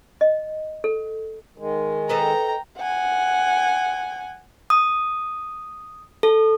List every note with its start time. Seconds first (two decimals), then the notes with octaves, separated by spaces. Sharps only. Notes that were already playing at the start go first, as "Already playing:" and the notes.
0.21 D#5
0.84 A4
1.58 D#3 G#3
2.09 A4 B4 D#5 G5 A#5
2.78 F#5 G#5
4.70 D#6
6.23 A4